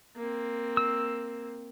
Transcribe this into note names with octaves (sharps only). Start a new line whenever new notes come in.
A#3 C4
E6